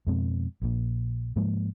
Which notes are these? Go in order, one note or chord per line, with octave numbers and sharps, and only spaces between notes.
F2 B2 G#3 C4
A#1 A#2
G#2 F3 G#3 A#3